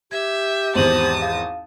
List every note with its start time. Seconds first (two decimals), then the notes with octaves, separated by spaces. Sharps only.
0.11 G4 E5 G#6
0.75 G#1 E2 C5 A5 D#6 D#7 F#7
1.22 F5